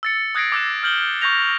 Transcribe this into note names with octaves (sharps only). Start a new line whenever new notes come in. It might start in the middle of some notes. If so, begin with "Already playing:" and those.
E6 A6 C#7
D#6 F#6 G#6 A#6 C7 D7
D6 E6 F#6 E7
F6 G6 F#7 G7
C#6 F#6 G6 A#6 F7